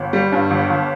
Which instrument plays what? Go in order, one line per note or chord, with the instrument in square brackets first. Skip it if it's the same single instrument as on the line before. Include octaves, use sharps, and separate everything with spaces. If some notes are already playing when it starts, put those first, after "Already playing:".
Already playing: [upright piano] G1
G3
G2
G1
G1